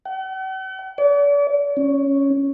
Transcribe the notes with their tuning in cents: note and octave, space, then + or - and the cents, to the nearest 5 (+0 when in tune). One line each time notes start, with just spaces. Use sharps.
F#5 +45
D5 -40
C#4 +0